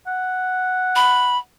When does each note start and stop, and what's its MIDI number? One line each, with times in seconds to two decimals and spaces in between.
0.07 1.39 78
0.96 1.38 83